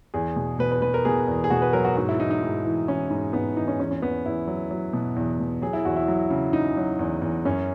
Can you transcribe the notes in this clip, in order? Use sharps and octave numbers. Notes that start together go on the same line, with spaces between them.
E2 G#4
B2
B2 B4
B4
B2 B4
A#4
B2 G#4
E2
G#4
B2 F#4
B4
F#3 A#4
F#4
G#2 F#4
E4
E3 D#4
D#4
G#2
E3
E3 C#4
G#2
G#2 B3
E3 D#4
C#4
E2 C#4
C#4
E2 B3
E2 E4
F#3
F#3
B2
E2
B2
F#3 G#4
E4
E2 F#4
E4
F#3
C#3
C#3 D#4
F#3
E2
E2
F#2 C#4